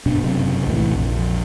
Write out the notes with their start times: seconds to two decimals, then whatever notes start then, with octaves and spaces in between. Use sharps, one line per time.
0.06 G2 B2 B3 D4
0.22 F#1 F#2 C3
0.67 C2 A2 E3
0.91 A#1 F2